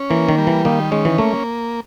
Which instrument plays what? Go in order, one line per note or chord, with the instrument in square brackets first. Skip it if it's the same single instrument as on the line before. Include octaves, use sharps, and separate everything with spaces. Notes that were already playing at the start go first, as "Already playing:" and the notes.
Already playing: [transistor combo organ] C#4
[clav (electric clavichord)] E3 [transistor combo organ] A#3
[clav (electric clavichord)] D#3
[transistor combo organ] G3
[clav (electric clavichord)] E3
[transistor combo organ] D#3 [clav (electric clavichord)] A#3
[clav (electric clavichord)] G#3 [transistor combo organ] C#4
[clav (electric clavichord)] E3
[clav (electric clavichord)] A3 [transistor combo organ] A#3